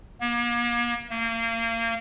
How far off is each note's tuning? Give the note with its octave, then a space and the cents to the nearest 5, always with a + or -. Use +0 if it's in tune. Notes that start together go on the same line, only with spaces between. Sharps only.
A#3 +40
A#3 -30